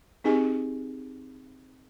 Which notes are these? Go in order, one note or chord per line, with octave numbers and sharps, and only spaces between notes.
C4 D#4 G4 G#4 D#5 G#5